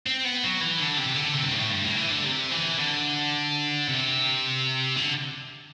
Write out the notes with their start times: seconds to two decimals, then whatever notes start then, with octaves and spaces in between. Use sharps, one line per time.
0.07 C4
0.25 B3
0.43 F#3
0.61 E3
0.79 D3
0.97 C3
1.15 D3
1.33 C3
1.43 G2
1.52 A2
1.70 G2
1.84 A2
1.97 E3
2.10 D3
2.24 C3
2.52 E3
2.79 D3
3.88 C3
4.96 D3